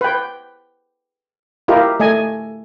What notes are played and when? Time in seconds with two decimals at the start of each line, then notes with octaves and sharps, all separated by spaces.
0.01 B4 G5
1.68 E4 F4 G4 A#4 D#5
2.00 A3 D#5 G#5